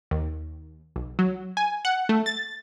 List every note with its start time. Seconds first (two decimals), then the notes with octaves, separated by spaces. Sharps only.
0.11 D#2
0.96 B1
1.19 F#3
1.57 G#5
1.85 F#5
2.09 A3
2.26 A6